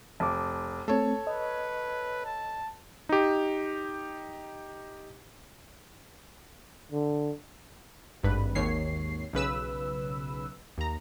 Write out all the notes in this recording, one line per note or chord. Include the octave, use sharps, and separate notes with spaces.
F1 A5 D6
A3 C4 A4 C#5
B4 D#5
A5
D#4 G4
D3
G#1 G2 B4
G#1 D#2 C#5 C7
B1 C#3 B4 E6
D#2 A#5